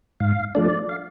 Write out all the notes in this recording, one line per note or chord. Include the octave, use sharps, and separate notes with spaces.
G#2 F5
F3 A3 D4 D5
F5